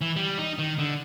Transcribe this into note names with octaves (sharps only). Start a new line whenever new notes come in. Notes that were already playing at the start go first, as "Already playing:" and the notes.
E3
G3
D#4
D#3
D3